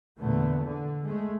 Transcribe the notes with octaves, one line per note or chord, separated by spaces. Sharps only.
E2 A#2 D3 A3 B3
D3
G#3 A3